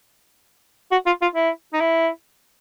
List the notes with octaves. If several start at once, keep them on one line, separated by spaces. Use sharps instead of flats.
F#4
F4
F4
E4
D#4
E4